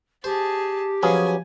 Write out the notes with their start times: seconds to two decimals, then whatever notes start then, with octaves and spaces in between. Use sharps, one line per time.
0.24 G4 G#4 C5 A5
1.03 F3 F#3 B3 C#4 G#4 G#5